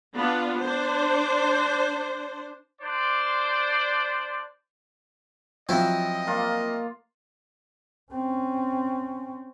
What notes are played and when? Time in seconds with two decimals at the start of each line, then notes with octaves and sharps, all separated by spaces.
0.14 B3 D4 F4
0.61 D4 C5
2.82 D4 C5 D5 C6
5.69 F3 F#3 C4 E4 D#5
6.27 A#3 F4 A#4
8.12 C4 C#4